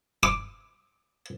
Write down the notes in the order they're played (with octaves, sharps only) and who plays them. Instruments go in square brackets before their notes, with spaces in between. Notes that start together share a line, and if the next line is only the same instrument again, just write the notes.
[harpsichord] D6